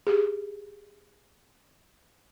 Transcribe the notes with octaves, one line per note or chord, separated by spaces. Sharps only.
G4 G#4